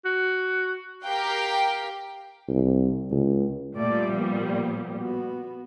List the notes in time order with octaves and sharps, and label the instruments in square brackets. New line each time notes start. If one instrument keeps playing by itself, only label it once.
[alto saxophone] F#4
[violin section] G4 A#4 F5 G5
[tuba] C2
C#2
[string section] A#2 G3 [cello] A3 D5
[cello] F3 B3
B3 F#4